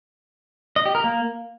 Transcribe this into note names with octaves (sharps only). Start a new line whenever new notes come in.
D#5
G4
A#4
A#3